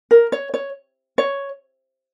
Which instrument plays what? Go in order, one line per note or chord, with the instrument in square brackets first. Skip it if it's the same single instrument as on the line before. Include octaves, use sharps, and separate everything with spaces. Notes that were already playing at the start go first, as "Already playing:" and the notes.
[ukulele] A#4
C#5
C#5
C#5